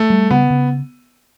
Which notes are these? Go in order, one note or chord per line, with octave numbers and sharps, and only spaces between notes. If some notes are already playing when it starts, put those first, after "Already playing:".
Already playing: A3
G3
C#3 B3
C#3